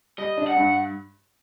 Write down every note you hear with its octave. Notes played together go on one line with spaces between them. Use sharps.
G3 D#5
D4
F#5
G2